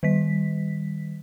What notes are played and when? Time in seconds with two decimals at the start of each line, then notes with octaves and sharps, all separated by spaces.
0.03 D#3 G3 B6